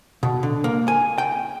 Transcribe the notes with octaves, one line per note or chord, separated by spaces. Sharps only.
B2
D3
A#3
G#5
G5